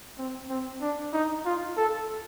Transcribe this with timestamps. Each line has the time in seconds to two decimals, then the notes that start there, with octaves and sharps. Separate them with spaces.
0.18 C4
0.49 C4
0.81 D4
1.13 D#4
1.45 F4
1.77 A4